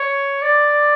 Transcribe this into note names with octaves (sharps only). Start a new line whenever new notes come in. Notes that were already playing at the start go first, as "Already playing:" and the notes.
Already playing: C#5
D5